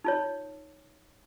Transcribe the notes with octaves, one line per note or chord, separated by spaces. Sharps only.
D#4 F4 C#5